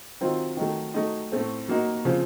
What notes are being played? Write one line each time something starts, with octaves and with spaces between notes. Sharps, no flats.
D#3 F#3 C4 F4
D#3 F#3 A3
F#3 A3 D#4
A2 A3 C4
F#3 A#3 D#4 F#4
C#3 F3 C4